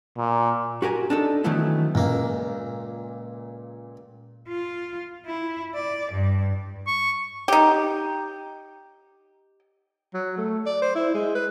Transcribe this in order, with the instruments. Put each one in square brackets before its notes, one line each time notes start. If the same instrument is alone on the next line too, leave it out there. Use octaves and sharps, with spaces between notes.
[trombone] A#2
[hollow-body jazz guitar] F#4 G4 A#4 G#5
D4 D#4 A4
D#3 E3 F#3 A3 B3 E4
[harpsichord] C#2 A#3 [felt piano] A#2
[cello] F4
E4
D5
G2
[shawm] C#6
[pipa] D#4 G4
[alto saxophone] F#3
A3
D5
C5
E4
G#3
B4